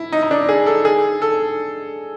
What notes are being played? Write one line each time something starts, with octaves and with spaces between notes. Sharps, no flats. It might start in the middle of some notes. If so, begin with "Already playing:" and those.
Already playing: E4
D#4
D#4
D4
G#4
A4
G#4
A4